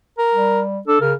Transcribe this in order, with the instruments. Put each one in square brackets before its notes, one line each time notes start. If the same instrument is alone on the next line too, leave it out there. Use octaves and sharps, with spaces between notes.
[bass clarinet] A#4
[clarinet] G3
[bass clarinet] D4 [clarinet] A4
[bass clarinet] C#3 [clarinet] A#4